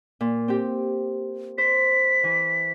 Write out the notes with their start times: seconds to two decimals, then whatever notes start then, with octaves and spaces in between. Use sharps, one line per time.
0.21 A#2
0.48 C4 G4
1.58 C5 B6
2.24 E3